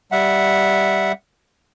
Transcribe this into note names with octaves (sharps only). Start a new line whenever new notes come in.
G3 E5 F#5